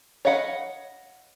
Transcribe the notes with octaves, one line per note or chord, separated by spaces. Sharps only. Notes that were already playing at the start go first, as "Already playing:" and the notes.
C#5 D#5 F5 F#5 B5